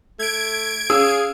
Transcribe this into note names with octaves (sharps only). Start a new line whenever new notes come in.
A3 G#6 D7
C#4 G#4 F5 E6